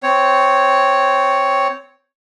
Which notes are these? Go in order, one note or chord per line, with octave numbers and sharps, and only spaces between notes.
C4 C#5